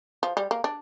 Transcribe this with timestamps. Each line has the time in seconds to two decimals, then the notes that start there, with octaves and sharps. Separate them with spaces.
0.23 F3
0.37 G3
0.51 A#3
0.64 D4